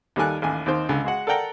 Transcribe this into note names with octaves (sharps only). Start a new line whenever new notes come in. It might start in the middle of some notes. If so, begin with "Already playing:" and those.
D#2 D#3 G3 A4 G#5 F#6
A1 D#2 G#5
D#2 C4 D#4 C5
C#2 D3
G#3 F#4 F#5
A4 A#4 D5 F#5 G5 A#5